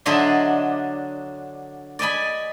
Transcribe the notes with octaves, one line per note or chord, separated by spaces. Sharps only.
D3 F#3 D4 D#5 E5 C6
D5 D#5 G#5 B5